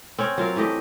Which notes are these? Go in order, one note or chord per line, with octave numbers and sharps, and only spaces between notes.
C4 C#4 C#5
F#3 F4 A#4 F5
E3 A3 G4 D#5